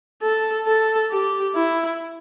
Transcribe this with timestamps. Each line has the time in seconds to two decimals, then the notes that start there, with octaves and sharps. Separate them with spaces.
0.22 A4
0.67 A4
1.11 G4
1.55 E4